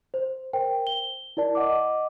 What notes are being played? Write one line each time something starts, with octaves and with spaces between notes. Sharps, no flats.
C5
A#4 C5 G5
G7
E4 A#4 D5 A5
D#5 F#5 D6